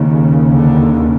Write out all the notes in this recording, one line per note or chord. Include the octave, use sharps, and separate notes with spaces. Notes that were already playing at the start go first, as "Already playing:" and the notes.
Already playing: D#2 C#3
D3